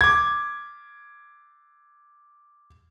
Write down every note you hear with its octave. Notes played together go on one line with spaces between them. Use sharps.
D6 G#6